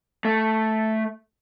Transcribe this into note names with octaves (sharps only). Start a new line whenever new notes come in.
A3